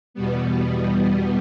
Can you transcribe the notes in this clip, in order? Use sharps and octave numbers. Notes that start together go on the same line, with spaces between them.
E2 B2 G3 B3